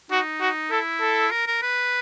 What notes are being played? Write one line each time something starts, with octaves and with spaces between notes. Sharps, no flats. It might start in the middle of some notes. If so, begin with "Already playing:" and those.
D#4 F#4
F#4
E4 A4
A4
A#4
A#4
B4